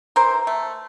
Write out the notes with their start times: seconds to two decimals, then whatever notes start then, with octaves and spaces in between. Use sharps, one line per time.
0.16 E3 A#4 C5
0.47 A3